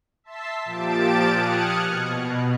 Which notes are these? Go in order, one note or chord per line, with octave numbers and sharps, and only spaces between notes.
E5 A5 C6 E6 B6
A#2 F3 G4 A5 A6 D7
D#6 F6 F#6 G#6 C#7
B2